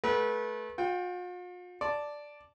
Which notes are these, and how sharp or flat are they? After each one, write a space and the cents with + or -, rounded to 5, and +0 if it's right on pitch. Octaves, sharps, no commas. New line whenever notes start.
A3 -25 B4 -25 F#5 +30
F4 +45 G5 +0
D5 +0 A5 +0